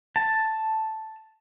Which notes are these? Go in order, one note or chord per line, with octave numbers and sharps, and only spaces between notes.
A5